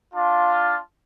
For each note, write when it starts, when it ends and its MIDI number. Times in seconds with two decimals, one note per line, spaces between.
0.14 0.76 62
0.14 0.76 65